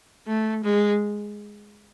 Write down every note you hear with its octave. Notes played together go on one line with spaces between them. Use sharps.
A3
G#3